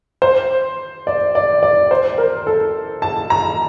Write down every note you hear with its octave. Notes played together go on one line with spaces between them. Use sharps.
C5
D5
D5
D5
C5
A#4
A4
A5
A#5